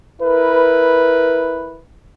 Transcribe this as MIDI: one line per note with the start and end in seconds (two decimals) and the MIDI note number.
0.22 1.81 64
0.22 1.81 70
0.22 1.81 71